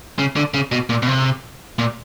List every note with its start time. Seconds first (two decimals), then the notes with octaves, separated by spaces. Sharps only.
0.19 C#3
0.36 D3
0.54 C#3
0.72 B2
0.89 A#2
1.03 B2
1.07 C3
1.79 A#2